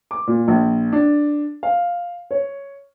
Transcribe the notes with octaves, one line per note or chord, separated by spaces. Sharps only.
D6
A#2
A#1
D4
F5
C#5